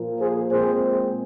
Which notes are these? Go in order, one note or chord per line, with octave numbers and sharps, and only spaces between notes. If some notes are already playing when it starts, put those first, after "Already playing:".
Already playing: A#2 F3 A#3
G#4 C5
A#2 G#3 C4 G#4 C5